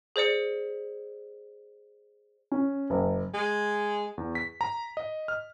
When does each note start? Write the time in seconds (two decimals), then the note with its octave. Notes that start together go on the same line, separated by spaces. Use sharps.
0.16 G#4 C5 D5 C#7
2.52 C#4
2.90 F#1
3.34 G#3
4.18 E2
4.35 B6
4.61 A#5
4.97 D#5
5.28 F6